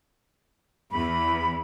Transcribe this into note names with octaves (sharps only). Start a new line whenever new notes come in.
E2 B5